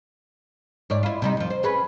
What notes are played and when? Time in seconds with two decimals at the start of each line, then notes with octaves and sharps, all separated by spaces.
0.90 G#2 C#5 D5
1.03 E4 F4
1.22 C3 G3 D#4
1.37 D#2 F3
1.50 C5
1.63 C#4 G#4 B4